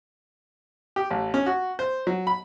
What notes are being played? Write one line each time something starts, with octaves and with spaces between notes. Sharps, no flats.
G4
A1
C#4
F#4
C5
F#3
B5